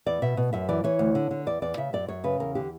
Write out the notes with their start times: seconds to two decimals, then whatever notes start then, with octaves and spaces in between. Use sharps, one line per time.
0.06 E2 D5
0.22 B2 E5
0.37 B2
0.53 F#2 E5
0.69 E3 D5
0.84 E3 C#5
0.99 D2
1.15 D3
1.31 D3
1.46 E2 D5
1.62 E2 D5
1.77 C#3 E5
1.93 F#2 D5
2.08 F#2 C#5
2.24 C#3 B4
2.40 E2 A#4
2.55 D3 G4